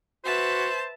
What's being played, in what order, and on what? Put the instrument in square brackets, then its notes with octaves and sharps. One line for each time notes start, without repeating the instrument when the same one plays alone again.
[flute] F#4 [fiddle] B4 E5 [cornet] C5 [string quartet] A5